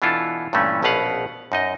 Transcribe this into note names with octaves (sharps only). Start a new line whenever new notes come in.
B2 E3 D4 E4 F4 A4
G2 A#2 E3 A3 C#4
A#1 B2 C#4 B4 F5 F#5
F#2 D#4 D#5